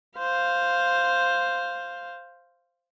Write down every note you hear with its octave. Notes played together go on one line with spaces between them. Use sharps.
C5 F5